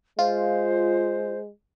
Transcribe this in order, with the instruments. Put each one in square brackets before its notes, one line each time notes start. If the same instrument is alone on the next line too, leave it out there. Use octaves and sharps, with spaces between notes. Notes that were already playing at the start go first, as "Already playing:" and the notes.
[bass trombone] G#3 [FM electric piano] F4 [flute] C5